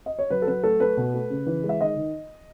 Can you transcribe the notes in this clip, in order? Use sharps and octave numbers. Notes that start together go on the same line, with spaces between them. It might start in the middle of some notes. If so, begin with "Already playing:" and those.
D#5
C#5
F#3 B4
A4
F#3 B4
A3 A4
A3 B4
B2
A3
C#3
E3
G#3
E5
D#3 D#5
D#3